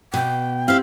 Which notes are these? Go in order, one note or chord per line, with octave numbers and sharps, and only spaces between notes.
B2 G5
C4 E4 G4 F5